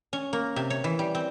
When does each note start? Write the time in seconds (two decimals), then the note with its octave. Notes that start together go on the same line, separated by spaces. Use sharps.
0.13 C#4
0.33 A#3
0.56 C3
0.70 C#5
0.84 E3
0.99 G3
1.15 C4